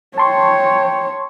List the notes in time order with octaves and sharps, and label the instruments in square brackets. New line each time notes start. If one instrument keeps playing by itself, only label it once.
[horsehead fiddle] C#5 [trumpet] G5 [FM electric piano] A5 C6 C#6